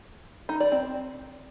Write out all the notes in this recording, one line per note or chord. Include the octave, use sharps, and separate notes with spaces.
D#4
D5
C4